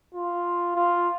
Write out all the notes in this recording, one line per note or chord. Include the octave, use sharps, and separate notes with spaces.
F4
F4